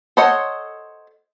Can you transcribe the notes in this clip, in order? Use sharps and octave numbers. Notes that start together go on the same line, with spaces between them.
A4 C5 C#5 D#5 F#5